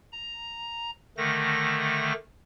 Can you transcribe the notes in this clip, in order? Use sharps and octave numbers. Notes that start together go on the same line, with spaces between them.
A#5
D3 D#3 A3 A#6